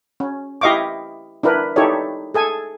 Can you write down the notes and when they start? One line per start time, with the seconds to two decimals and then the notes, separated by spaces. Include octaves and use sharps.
0.20 C#4
0.61 E4 G4 D#5 F5 C#6 D6
1.43 D4 E4 A#4 B4
1.76 D#4 E4 G4 A4 C#5 D5
2.34 G#4 A4 G#5